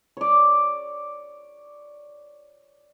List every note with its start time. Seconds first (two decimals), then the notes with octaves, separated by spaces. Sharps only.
0.17 C#5 D5